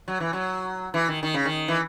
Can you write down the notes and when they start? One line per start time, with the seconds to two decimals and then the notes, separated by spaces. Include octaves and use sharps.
0.08 F#3
0.20 E3
0.33 F#3
0.94 E3
1.08 D#3
1.23 D#3
1.34 C#3
1.46 D#3
1.68 E3